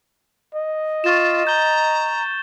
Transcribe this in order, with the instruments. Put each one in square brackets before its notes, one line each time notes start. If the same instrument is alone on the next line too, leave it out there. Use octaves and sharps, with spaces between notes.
[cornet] D#5
[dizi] F4 [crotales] C#6 A6 E7
[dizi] A#5 [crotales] G6 G7